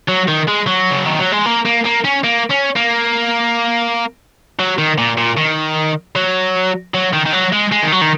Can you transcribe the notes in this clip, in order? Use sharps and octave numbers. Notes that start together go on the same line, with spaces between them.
F#3
D#3
G#3
F#3
C#3
D#3
F#3
G#3
A#3
A#3
A#3
C#4
A#3
C#4
A#3
F#3
D#3
A#2
A#2
D#3
F#3
F#3
D#3
D#3
F#3
G#3
G#3
D#3
F#3
D#3